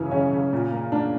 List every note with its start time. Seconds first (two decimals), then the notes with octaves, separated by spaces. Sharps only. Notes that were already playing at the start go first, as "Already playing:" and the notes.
Already playing: F#2 C#3 E3 C#4
0.11 C#3 C#4
0.32 C#3
0.53 A#2
0.72 A#3
0.92 A#3 D4